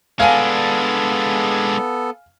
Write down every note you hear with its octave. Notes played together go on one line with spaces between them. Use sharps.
G#3 B3 D4 A4 F5 G#5